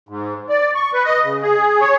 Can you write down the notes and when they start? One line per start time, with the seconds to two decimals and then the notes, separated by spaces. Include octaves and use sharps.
0.09 G#2
0.49 D5
0.75 C#6
0.93 B4
1.05 D#5
1.24 C#3
1.42 G#4
1.80 C#5